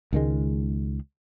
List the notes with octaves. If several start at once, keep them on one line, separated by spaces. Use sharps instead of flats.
C#2 D#3 G#3